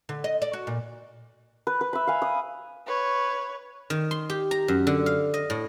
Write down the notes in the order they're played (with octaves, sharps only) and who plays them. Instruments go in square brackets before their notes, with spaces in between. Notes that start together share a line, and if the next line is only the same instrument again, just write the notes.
[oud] D3
D#5
D5
F#4
A#2
[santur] B4
B4
E5 B5
F5 G#5
D#6
[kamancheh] B4 C#5
[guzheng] D#3
C6
G4
A#5
F#2
D3
F5
D#5
A2